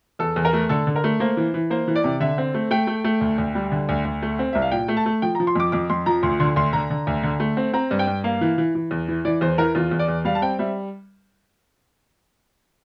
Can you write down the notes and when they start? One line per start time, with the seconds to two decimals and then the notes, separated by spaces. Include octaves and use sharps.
0.19 E2 A4
0.36 E2
0.45 A#4
0.53 A3
0.69 D3 A4
0.87 D3
0.96 A#4
1.04 A3
1.20 A#3 C5
1.37 E3
1.54 E3
1.70 A#3 C5
1.88 E3
1.96 D5
2.04 C3
2.20 D3 E5
2.38 C4
2.54 A3
2.71 A3 G5
2.87 A3
3.04 A3
3.21 D2
3.38 D2
3.55 G3
3.72 D3
3.89 D2
4.05 D2
4.22 A3
4.39 C4
4.53 C2 E5
4.62 F5
4.72 A#2 G5
4.88 A3
4.97 A5
5.06 A3
5.22 F3 G5
5.35 A#5
5.40 F3
5.47 C6
5.55 F2 D6
5.72 F2 D6
5.90 F2 C6
6.06 F3 A#5
6.23 D2 C6
6.40 D3 C6
6.56 D2 C6
6.73 D3 A#5
6.90 D3
7.07 D2
7.23 D3
7.40 A3
7.57 C4
7.73 C4 A#5
7.91 G2
7.99 G5
8.07 G2
8.24 A#3 F5
8.41 E3
8.58 E3
8.75 E3
8.91 E2
9.08 E3
9.25 E3 D5
9.41 E2 C5
9.58 E3 A#4
9.75 E2 F4
9.91 E2
9.99 D5
10.08 E2
10.25 G3 F5
10.35 A5
10.42 C4 G5
10.59 G3 E5